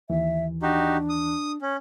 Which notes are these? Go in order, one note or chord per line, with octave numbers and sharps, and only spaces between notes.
D#2 E3 E5
D4 D#4 F#4 G4
D#6
C#4